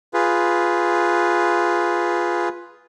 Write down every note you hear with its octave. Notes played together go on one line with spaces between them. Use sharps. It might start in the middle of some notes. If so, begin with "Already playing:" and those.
F4 G#4 B4